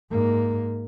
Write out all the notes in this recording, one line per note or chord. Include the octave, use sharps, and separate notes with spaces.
G#2 A#3